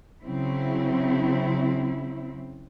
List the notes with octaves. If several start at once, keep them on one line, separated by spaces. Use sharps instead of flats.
C#3 F#3 C4 E4